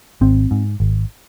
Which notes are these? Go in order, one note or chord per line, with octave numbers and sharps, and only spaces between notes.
G#1 C4
G#2
G#1